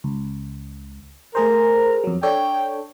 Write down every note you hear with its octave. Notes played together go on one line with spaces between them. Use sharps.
C#2
A3 G#4 A#4 C5
F2 F#3
D4 A4 C#5 G5